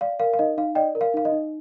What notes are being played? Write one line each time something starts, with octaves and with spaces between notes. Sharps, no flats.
D5 F5
A#4 F5
F5
D#4 D#5
D#4 F5
D5 D#5 G5
A#4
F5
D#4 F5
D#5
D#4